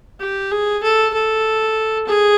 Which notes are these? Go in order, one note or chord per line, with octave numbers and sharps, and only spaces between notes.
G4
G#4
A4
A4
G#4